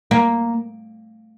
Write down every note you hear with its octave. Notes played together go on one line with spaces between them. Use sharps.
A#3